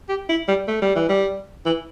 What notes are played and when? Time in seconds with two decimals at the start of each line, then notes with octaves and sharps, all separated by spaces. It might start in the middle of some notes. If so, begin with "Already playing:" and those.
0.09 G4
0.29 E4
0.48 G3
0.68 A3
0.82 G3
0.95 E3
1.09 G3
1.66 E3